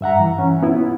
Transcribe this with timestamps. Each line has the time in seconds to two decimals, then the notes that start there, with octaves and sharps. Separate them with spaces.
0.01 G2 E5 F#5 A#5
0.19 E3
0.39 C#4
0.63 B3 E4